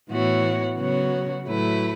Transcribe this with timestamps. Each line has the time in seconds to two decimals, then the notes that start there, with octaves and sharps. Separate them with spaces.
0.09 A2 E3 B3 F#4 C#5
0.77 C#3 F#3 B3 F#4 C#5
1.45 A2 F#3 A3 E4 B4